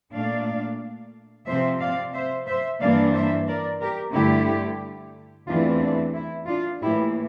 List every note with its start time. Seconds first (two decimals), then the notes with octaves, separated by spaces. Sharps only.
0.14 A#2 A3 D4 D5 F5
1.47 C3 F3 C4 C5 E5
1.80 D5 F5
2.14 C5 E5
2.47 C5 E5
2.80 G2 E3 A#3 D4 D5 F5
3.13 C5 E5
3.47 A#4 D5
3.81 G4 A#4
4.14 G2 D3 A3 E4 G4
5.47 E2 E3 A3 C4 D4 F4
5.81 D4
6.14 E4
6.47 D4 F4
6.81 A2 E3 A#3 E4 G4